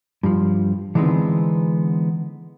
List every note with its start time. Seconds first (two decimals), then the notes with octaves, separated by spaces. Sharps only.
0.23 G2 F3
0.95 D3 E3 G#3 B3 C4 D#4